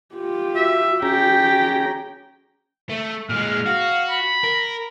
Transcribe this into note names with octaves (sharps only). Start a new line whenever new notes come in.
F4 G4
F#4 E5
C#4 G4 G#4 G5 A#5
A3
A#2 G#3 F6
F#4 F5
B5
A#4